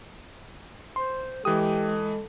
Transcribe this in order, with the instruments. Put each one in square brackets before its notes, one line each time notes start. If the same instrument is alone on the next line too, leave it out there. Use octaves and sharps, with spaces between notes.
[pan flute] C5 [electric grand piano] C6
[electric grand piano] E3 D#6 [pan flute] G#3 [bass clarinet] G4 [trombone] A4